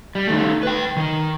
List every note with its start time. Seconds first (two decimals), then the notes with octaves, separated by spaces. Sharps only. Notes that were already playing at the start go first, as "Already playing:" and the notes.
0.15 G3
0.27 D#3 A3
0.63 B4 G5
0.97 D#3 A#4